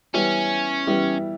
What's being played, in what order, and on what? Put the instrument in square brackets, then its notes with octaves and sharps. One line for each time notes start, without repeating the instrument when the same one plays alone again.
[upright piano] E3 G3 B3 E4 G4 [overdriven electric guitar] C#4
[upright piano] E3 G3 B3 E4 G4